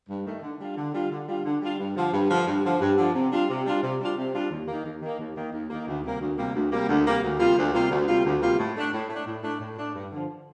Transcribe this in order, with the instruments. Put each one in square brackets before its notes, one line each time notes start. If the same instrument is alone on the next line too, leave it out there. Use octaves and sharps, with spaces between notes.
[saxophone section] G2
D#3 A3
D3
G3 D4 F4
D3
G3 D4 F4
D3
G3 D4 F4
D3
G3 D4 F4
G2
D3 F3
G2
D3 F3
G2
D3 F3
G2
D3 F3
C3
G3 D4 F4
C3
G3 D4 F4
C3
G3 D4 F4
C3
G3 D4 F4
D#2
D#3 A#3
D#2
D#3 A#3
D#2
D#3 A#3
D#2
D#3 A#3
D2
C3 G3 A#3
D2
C3 G3 A#3
D2
C3 G3 A#3
D2
C3 G3 A#3
D2
C3 G3 A#3 F4
D2
C3 G3 A#3 F4
D2
C3 G3 A#3 F4
D2
C3 G3 A#3 F4
A2
A3 D4
A2
A3 D4
A2
A3 D4
A2
A3 D4
G2
D3 F3